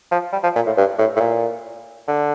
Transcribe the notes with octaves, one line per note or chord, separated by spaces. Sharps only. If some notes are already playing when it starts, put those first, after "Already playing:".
F3
G3
F3
A#2
A2
G2
A2
A2
A#2
D3